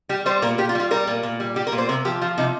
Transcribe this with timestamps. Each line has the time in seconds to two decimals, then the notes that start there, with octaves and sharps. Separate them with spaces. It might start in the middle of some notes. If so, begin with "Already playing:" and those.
0.09 G3 G4
0.26 G3 C5
0.42 A#2 A#4
0.58 A#2 G4
0.69 F4
0.75 G3
0.80 F4
0.91 G3 A#4
1.07 A#2
1.23 A#2
1.40 G3
1.56 G3 G4
1.67 A#4
1.72 A#2
1.78 C5
1.89 C3 A#4
2.05 F3 G4
2.21 F3 F4
2.38 C3 D#4